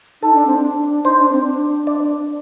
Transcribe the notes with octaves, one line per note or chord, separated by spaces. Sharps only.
D#4 A4
D4
C4
D4
D#4 C5
D4
C4
D4
D5